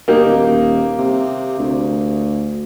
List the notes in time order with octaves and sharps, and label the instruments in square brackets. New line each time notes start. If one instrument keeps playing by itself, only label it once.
[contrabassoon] G1 [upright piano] A#3 D#4 G4
[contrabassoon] D#1
C3
D2